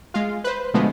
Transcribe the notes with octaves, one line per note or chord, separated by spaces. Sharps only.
G#3 F4
B4 C5
B2 D3 F3 G#3 A3 B3